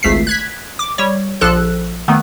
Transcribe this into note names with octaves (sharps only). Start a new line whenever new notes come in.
G#1 C#2 A3 B6 C7
F#6 G#6 B6
D6
G3 C#5
A#1 F3 A4 F#6
D#3 A3 B3